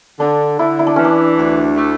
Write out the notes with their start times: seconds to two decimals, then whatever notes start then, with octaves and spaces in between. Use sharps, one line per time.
0.20 D3 D4
0.59 D3 E4
0.79 E4
0.87 D4
0.96 E3 C#4
1.04 D4
1.38 D2
1.77 A3